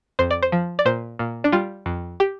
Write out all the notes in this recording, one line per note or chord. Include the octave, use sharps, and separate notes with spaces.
F2 C5
D5
C5
F3
D5
A#2 C5
A#2
D4
G3 F4
F2
G4